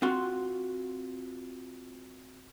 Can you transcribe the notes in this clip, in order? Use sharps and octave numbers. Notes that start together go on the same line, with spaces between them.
C4 F4 F#4 C6